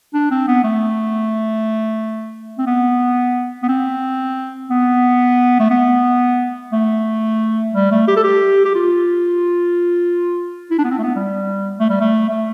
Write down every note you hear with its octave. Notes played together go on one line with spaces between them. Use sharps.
D4
C4
B3
A3
C4
B3
B3
C4
B3
A3
B3
A3
G3
A3
G4
A4
G4
G4
F4
E4
D4
B3
C4
A3
B3
G3
A3
G3
A3
A3